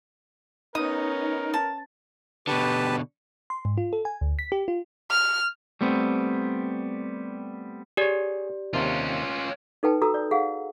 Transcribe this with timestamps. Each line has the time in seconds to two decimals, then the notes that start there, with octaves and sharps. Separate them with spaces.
0.75 B3 C#4 D#4 A#4 D#6
1.54 A5
2.47 B2 D3 G4 B4 A5
3.50 C6
3.65 G#2
3.78 F4
3.93 A4
4.05 G#5
4.21 D2
4.39 B6
4.52 G4
4.68 F4
5.11 F6
5.81 G3 A3 B3 C4
7.97 G4 G#4 C#5 D5
8.73 D#2 C3 C#4 F4
9.83 D#4 A4 B4 G5 A5
10.02 F#4 A4 A#5 D#6 E6
10.14 D5
10.31 G#4 F5 F#5